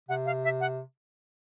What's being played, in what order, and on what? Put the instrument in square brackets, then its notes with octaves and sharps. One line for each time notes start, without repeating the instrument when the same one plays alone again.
[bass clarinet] C3 [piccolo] F#5
[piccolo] F5
E5
F#5